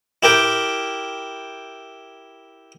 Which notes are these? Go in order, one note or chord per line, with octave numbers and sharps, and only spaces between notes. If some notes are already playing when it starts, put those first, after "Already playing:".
E4 G4 A#4 G5